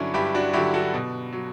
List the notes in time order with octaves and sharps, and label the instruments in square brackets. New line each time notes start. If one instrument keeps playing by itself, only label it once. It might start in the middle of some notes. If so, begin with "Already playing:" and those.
Already playing: [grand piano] G2 D3 F#3 C#4 D4 E4
G2 E4 G4
D4 F#4
D3 F#3 E4 G4
F#4 A4
B2
F#3